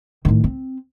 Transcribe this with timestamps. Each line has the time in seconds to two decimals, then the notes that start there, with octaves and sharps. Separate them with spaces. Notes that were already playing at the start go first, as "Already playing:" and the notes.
0.25 A2 D#3
0.44 C4